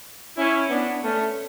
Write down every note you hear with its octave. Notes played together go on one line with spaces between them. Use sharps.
C#4 E4
B3 D4
A3 C#4